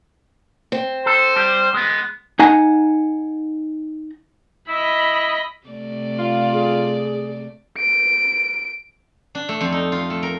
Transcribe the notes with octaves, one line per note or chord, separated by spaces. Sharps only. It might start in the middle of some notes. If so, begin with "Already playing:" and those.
C4
A4 C5
G3 G4
G#3 B3
D#4 F#5 G#5 A#5
E4 D#5 B5
C3 A3 D5
F4
G#4
D7
D4
A3
F2
D#4
F4
A3
A#4